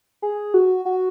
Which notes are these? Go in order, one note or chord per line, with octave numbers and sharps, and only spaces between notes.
G#4
F#4
F#4